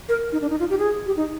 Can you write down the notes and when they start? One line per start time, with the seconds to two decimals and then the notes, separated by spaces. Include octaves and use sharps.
0.09 A#4
0.32 D#4
0.41 D4
0.50 D#4
0.60 F4
0.70 G4
0.79 G#4
1.07 G4
1.17 D#4